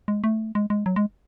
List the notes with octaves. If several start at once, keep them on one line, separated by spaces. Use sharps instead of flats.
G#3
A3
G#3
G#3
F#3
G#3